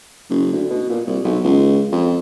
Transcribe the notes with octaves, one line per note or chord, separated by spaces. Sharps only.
F#1
D2
B2
A#2
C2
B1
C#2
F2